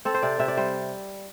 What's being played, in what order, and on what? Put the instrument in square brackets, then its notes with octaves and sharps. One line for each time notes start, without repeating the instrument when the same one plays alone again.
[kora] C4 A4
C5
C3 D5
C3 E5
D5
G3 C5